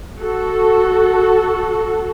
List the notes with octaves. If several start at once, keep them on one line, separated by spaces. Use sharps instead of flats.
F#4 A4